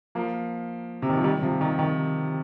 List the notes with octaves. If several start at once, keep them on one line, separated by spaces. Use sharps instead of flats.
F3 A#3
C3
D#3
F3
D#3 G3
C3 F3
D#3
D#3